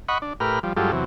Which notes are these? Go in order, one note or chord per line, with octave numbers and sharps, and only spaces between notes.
D#5 F#5 B5 C#6
D4
A2 G4 A#4 B4 F6
F3 G3
G2 F#3 G#3 F4 G4 A4
E2 C3 F#3